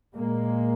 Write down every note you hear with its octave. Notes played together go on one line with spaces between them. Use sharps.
A#2 G#3 A#3